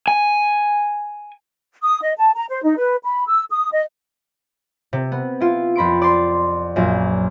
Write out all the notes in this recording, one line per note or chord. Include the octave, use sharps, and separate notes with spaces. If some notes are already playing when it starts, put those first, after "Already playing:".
G#5
D#6
D#5
A5
A#5
C5
D#4
B4
B5
E6
D#6
D#5
C3
B3
E4 F4
F2 B5 C6 D7
D5 C6
A#1 F#2